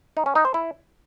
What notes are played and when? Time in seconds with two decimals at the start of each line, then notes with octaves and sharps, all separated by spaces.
0.17 D#4
0.26 C#4
0.35 D#4
0.45 C5
0.54 E4